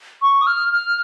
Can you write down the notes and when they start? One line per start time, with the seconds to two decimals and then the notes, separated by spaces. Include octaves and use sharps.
0.22 C#6
0.41 D#6
0.47 F6
0.72 F6